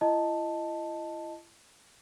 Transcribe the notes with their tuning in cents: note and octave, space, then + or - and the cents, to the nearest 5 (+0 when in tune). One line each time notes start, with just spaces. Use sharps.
E4 +40 D#5 +0 A5 +0